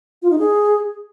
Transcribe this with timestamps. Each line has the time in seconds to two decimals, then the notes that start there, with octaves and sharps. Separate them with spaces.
0.22 F4
0.30 D#4
0.38 G#4